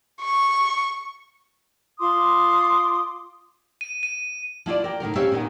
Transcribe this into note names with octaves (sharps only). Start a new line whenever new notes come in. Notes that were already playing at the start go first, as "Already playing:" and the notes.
C#6
F4 C6 D6 D#6
D#7
D#7
F3 E4 F4 D5
A#4 G5
A2 D#3 F#3 A#4
C4 C#4 G4 C#5 E5 F5
A#2 D#3 B3